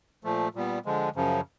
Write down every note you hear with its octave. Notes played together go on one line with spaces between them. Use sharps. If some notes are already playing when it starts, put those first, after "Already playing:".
A#2 F3 A3
A#2 G3 B3
D3 F3 G#3
F#2 C#3 F3